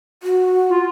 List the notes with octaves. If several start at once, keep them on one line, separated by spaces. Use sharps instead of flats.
F#4
F4